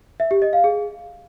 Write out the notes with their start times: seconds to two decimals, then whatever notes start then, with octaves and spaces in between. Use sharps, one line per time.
0.20 E5
0.31 G4
0.42 D#5
0.53 F5
0.64 G#4